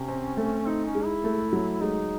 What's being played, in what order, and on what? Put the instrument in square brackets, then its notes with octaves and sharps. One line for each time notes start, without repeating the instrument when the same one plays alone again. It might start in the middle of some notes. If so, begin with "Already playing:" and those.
Already playing: [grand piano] C3 [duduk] C#4
[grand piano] C4
A3
[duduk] C4 [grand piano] D#4
[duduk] C#4
[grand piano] G#3
[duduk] E4
[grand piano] A3
F#3
[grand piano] G#3 [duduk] D#4